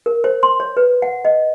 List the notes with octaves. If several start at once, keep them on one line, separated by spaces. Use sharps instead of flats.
A#4
C5
C6
C#5
B4
F#5
D#5